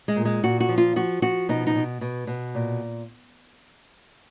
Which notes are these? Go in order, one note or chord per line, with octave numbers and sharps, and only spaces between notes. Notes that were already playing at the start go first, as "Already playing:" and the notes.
G#3
A#2
G#3
A#2 F#4
F#4
F3
F4
F3 F#4
F3 F#4
B2 D#4
D#4
B2
B2
B2
A#2